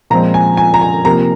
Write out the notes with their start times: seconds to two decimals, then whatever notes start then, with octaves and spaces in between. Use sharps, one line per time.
0.10 A#2 F3 G#3 C4 A#5
0.34 G#5
0.57 G#5
0.74 A#5
0.81 G#5
1.05 C3 F3 A#3 A#5